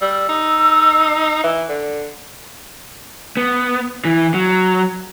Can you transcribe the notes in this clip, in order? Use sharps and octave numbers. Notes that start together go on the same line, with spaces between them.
G3 E6
D#4
E3
D3
B3
E3
F#3